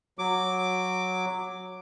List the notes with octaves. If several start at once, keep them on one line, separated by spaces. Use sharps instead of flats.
F#3 D6